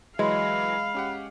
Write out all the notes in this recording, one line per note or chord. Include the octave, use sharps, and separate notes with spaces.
E3 F#3 G#3 F5 B5
C#4 G4 F#5